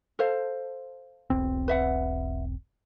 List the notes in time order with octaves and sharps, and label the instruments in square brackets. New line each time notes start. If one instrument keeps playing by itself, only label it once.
[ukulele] A4 C5 F5
[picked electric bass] E1 B1 C4
[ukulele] B4 E5 F#5